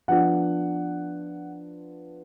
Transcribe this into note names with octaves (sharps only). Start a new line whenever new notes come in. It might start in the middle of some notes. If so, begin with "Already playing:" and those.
F3 B3 D4 F4 F#5